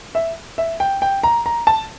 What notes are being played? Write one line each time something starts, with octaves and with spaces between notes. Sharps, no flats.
E5
E5
G5
G5
A#5
A#5
A5